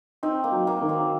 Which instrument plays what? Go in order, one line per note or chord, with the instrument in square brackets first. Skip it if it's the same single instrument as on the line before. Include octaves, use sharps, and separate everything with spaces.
[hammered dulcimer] C4 [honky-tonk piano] D#4
[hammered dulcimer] A#3
[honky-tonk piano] F#3
[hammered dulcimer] A#3
[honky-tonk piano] D#3
[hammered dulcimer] C4